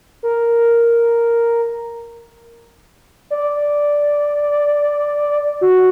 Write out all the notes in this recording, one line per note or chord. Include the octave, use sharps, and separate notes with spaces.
A#4
D5
F#4